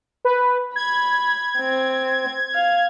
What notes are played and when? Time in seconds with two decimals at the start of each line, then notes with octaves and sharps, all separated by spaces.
0.25 B4
0.76 B5 G#6
1.58 C4
2.55 F5